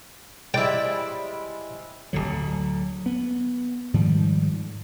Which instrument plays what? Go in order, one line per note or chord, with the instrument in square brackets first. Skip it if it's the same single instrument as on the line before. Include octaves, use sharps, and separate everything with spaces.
[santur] G3 G#3 C5 [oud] E4 D5 [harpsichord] G5
[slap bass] D1 G#1 D3 F#3
B3
G#2 D#3 F3 G3